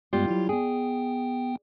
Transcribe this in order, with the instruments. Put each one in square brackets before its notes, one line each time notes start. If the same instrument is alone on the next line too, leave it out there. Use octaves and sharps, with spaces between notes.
[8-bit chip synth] G2 G#3 B3 [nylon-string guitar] G3 F4 G4
[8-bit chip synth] F#3 E4
[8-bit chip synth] B3 G5 [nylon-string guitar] G#4